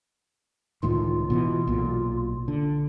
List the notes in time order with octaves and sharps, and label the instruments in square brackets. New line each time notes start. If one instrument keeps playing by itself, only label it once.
[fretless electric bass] C#2 A2 D#3 [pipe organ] F4
[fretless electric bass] B2 D3 E3
B1 A#2
D3